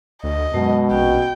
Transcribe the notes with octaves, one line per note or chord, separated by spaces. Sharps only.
D2 D#5
F#2 B2 G#3 A5
A#1 C#4 F#4 G5